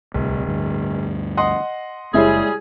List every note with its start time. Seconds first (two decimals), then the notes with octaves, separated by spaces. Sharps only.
0.14 D1 C2
0.47 D2 G2
1.37 D#5 F#5 C6 D#6
2.14 F#1 G3 G#3 E4 G#4 C#5